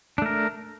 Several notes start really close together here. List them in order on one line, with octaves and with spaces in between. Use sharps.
D4 A3 A#4